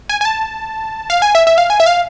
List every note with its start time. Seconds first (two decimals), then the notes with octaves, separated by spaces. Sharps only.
0.09 G#5
0.21 G#5
0.25 A5
1.10 F5
1.22 G#5
1.35 E5
1.47 E5
1.58 F5
1.70 G#5
1.80 E5
1.86 F5